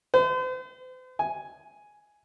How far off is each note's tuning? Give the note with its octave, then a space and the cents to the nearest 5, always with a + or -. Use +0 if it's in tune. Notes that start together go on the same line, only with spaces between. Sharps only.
C5 -45
G#5 +5